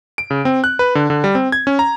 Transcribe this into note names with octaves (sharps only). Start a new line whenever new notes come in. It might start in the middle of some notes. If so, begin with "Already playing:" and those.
D7
C#3
C4
F#6
B4
D3
D3
G3
C4
G#6
C#4
A#5